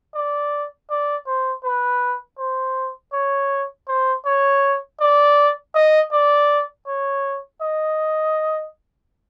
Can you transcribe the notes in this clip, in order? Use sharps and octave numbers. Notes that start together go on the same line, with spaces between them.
D5
D5
C5
B4
C5
C#5
C5
C#5
D5
D#5
D5
C#5
D#5